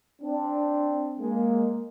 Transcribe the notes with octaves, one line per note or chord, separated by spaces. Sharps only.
C4 D4
G#3 A#3